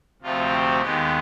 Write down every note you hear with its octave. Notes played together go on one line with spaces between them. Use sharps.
D2 C3 F3 A3 C4 F4
G4
D#2 D#3 G#3 B3 G4